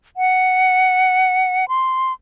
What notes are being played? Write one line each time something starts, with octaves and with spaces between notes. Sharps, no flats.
F#5
C6